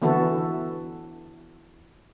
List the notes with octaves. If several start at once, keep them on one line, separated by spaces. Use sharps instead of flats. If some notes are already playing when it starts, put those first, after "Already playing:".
D3 E3 B3 E4 F#4 A4